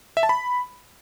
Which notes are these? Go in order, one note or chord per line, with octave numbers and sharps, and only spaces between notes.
E5
A5
B5